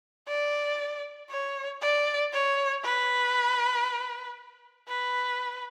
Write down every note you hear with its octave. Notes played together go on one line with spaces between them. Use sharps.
D5
C#5
D5
C#5
B4
B4